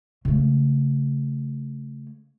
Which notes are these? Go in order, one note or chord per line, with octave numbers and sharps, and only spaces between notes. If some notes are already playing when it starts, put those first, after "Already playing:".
C#3 A3